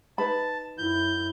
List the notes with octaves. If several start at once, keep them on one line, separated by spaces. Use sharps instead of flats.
D#4 B4 A5 B5
F#2 E4 G6